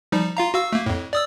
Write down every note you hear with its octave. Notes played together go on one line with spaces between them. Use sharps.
F3 G3 D#4
F4 F5 A#5
F#4 F5 E6
A3 A#3
F2 A2
D5 D#6 E6